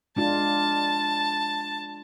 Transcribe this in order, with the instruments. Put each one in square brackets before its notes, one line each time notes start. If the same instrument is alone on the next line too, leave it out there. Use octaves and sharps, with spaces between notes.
[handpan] G#3 D4 F4 [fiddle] A5